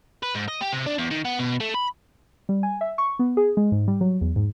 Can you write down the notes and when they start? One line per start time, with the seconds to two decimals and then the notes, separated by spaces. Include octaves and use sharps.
0.23 B4
0.35 G#2
0.48 D#5
0.61 G4
0.72 C3
0.86 D4
0.98 E2
1.11 D#3
1.25 B3
1.39 B2
1.61 A3
1.75 B5
2.49 G3
2.63 G#5
2.81 E5
2.98 C#6
3.19 B3
3.37 G#4
3.57 G#3
3.72 G#2
3.88 G3
4.01 F#3
4.21 E2
4.36 G#2